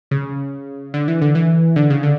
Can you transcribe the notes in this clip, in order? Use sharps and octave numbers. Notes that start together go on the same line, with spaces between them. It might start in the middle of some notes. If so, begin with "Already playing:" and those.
C#3
D3
E3
D3
E3
D3
C#3
D3